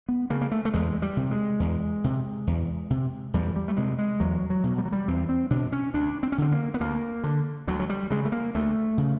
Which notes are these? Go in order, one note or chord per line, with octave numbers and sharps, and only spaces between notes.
B3
C#3 A#3
A#3
A3
A3
E2 G#3
G3
C3
G#3
E2
C3
E2
C3
E2 G3
G3
A3
C3 G#3
G#3
E2 F#3
F#3
B2
G3
F#3
G3
E2 C4
C4
B2 D4
C#4
D2 D4
C4
C#4
D3 C4
A#3
B3
D2 A#3
D3
D2 F#3
F#3
G3
C#3 G#3
A3
A#3
D2 A3
C#3